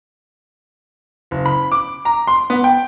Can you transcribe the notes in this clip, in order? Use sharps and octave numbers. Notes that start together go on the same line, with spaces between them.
F#1
B5
D6
A#5
C6
B3
G5